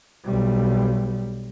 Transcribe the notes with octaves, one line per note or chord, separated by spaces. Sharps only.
B1 G3